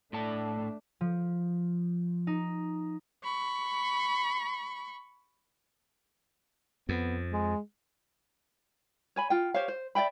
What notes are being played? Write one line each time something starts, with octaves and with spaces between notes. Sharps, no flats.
A2 A3 D4 A5
F3
D#4
B5 C#6
F2 B3
G#3
C#5 G#5 B5
F4 G5
G4 C5 C#5 F5
C5
D5 E5 G5 B5